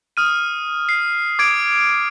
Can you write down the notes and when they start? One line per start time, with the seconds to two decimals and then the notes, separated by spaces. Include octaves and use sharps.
0.17 D#6 F6 D#7
0.89 C7
1.39 D6 G#6 D7